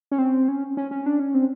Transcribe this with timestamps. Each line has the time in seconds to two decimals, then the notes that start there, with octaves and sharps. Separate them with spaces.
0.11 C#4
0.18 C4
0.48 C#4
0.77 C#4
0.91 C#4
1.06 D4
1.19 C#4
1.34 C4